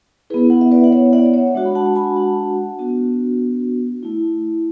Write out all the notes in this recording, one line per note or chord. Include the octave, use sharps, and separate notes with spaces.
B3 E4 G#4 B4
F#5
E5
B4 D5
F#5
C#5 E5
D5 F#5
F#5
C#5 E5
G#3 D4 F#4
B5
F#5 A5
G#5 B5
F#5 A5
B3 D4 F#4
A3 E4